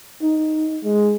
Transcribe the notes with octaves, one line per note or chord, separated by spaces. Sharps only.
D#4
G#3